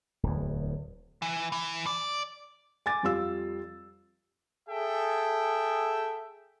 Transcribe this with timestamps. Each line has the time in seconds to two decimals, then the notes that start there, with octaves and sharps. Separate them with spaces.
0.23 D1 E2
1.22 E3
1.52 E3
1.86 D5
2.86 G#5 D6 A6
3.03 F2 G3 F4 E6
4.69 G#4 A4 E5 G5